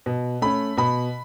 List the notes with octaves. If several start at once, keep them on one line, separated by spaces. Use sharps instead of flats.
B2
A3 C#4 B5
B2 B5